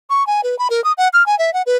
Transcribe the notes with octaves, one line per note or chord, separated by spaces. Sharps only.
C#6
G#5
B4
B5
A#4
D#6
F#5
F6
G#5
E5
F#5
B4